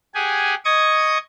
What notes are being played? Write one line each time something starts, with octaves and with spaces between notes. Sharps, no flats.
G4 G#4 F#5 G#5
D#5 C#6 D#6 G#6